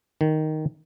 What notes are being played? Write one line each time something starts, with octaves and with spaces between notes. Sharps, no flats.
D#3